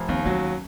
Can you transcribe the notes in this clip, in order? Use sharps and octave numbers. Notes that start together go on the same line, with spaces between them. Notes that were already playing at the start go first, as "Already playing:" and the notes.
Already playing: F1
D#2 C4
F#3 C#4